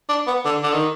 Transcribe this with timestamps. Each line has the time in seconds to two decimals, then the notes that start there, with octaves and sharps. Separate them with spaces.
0.09 D4
0.27 B3
0.45 D3
0.63 D3
0.73 D#3